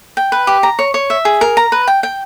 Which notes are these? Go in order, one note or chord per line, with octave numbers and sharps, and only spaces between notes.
G5
B4
G4
A#5
C#5
C#5
E5
G#4
A#4
A#5
B4
G5
G5